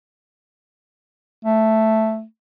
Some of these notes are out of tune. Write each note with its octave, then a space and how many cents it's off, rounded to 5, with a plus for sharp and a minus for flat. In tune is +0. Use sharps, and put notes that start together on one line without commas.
A3 +0